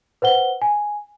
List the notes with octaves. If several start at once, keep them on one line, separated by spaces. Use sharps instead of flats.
B4 C5 F#5 G7
G#5